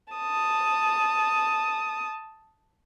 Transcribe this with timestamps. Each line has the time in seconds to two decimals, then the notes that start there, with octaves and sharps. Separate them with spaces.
0.13 A5 D#6